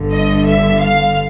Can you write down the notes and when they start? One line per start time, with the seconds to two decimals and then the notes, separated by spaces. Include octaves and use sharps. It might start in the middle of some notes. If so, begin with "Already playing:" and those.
Already playing: G1 G2 D3
0.12 D#5
0.46 E5
0.81 F5